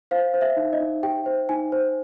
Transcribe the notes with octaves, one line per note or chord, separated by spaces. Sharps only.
C5 F5
C5
E5
D#4
D#5
D#4
G4 G5
C5
D#4 G#5
C5